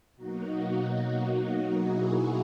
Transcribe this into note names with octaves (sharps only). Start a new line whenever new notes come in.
B2 F#3 A#3 D#4 F#4
D#4 F#4
E4 G#4